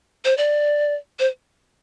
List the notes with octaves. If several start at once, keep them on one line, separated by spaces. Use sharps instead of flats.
C5
D5
C5